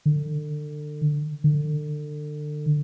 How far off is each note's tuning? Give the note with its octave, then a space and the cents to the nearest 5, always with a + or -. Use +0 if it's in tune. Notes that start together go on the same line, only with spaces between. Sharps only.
D3 +30
D3 +30